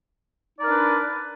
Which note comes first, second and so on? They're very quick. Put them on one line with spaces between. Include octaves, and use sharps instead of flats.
D#4 D5 A#4 D4 B4